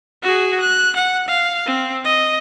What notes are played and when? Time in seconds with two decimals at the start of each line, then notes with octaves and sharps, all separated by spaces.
0.23 F#4 G#4
0.61 F#6
0.96 F#5
1.28 F5
1.66 C4
2.04 D#5